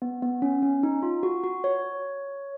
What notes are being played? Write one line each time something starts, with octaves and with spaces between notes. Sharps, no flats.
B3
B3
C#4
C#4
D#4
F4
F#4
F#4
C#5